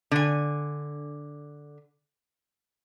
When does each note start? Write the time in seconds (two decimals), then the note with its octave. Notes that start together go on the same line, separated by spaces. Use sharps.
0.11 D3 G#5